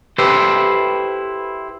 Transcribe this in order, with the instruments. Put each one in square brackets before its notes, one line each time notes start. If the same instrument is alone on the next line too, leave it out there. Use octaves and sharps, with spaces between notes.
[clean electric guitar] E4 G4 A4 B4 C5